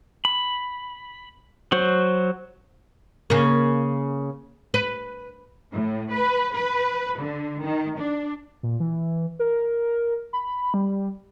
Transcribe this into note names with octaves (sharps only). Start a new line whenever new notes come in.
B5
F#3 F#4 C5
C#3 A#3
B4
A2
B4
B4
D3
D#3
D4
A#2
E3
A#4
B5
G3